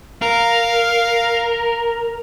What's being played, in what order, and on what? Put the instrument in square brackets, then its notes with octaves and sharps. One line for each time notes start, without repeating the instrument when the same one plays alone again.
[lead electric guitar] A#4 [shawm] F5